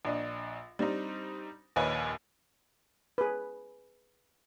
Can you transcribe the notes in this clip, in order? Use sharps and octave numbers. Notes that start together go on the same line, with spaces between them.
A#1 D4 D#5
G3 C4 D4 D#4
A#1 D#2 B4 C#5 D#5 G#5
G#4 B4